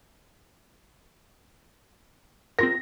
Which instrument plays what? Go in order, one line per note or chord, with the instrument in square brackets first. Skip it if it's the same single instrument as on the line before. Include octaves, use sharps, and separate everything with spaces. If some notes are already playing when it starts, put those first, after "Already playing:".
[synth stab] C4 F4 A#4 [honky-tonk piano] A#6